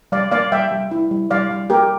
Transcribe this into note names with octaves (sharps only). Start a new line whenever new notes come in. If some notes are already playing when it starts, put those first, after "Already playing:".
G3 D5 F5
A#3 D5 F5
G3 E5 G5
G3
E4
G3
G3 D5 F5
G3
A#3 G4 A#4